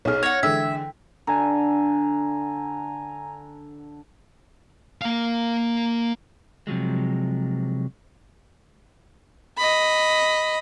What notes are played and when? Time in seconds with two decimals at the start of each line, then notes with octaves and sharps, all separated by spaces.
0.05 B1 G#4 C#5 F6
0.23 C#5 F#5 G#6 A#6
0.43 D3 E3 G#3 E5 G5
1.27 D3 G#5 A#5
5.02 A#3 F5
6.67 C3 F3 F#3 G#3
9.58 D#5 B5